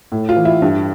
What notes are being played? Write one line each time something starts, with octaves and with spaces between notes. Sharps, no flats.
A2
F4
E3
E4
G2